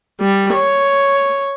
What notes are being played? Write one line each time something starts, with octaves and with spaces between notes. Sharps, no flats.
G3
C#5